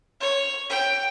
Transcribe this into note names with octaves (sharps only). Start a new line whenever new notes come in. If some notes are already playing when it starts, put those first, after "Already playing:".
C#5
G5